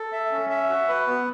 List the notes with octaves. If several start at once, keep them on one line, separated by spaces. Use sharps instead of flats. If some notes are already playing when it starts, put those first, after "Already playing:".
Already playing: A4
E5
C#4
E5
F#4
B4
B3